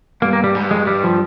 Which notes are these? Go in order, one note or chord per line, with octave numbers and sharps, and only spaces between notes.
G2 A#3
A#3
G3
G#2
G2
F2 G#3
G2
G3
F3